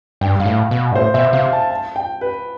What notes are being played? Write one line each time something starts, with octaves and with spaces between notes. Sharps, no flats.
G2 G5
G2 F5
A2
B2
G2
A2 C5
B2 E5
C3 F5
A5
A5
G5
B4